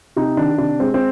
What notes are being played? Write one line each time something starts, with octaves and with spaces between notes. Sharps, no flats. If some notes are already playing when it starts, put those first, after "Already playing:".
C3 D#4
D#3 D4
C3 D4
G#3 C4
C4